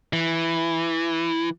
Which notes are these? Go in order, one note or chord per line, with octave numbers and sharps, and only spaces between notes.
E3